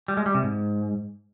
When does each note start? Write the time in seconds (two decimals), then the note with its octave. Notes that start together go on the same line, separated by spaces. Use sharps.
0.08 G3
0.17 G#3
0.26 G3
0.35 C3
0.43 G#2